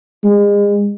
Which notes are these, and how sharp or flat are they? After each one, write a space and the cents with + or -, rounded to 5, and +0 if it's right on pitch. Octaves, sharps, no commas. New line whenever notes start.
G#3 -35